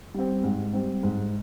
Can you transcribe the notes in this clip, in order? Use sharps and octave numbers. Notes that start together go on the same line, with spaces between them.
G3 C4
G#2
G3 C4
G#2